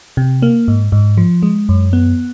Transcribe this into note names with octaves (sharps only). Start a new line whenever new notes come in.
C3
A#3
G#2
G#2
F3
G#3
F#2
B3